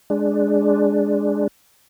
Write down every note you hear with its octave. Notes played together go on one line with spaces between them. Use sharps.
G#3 D4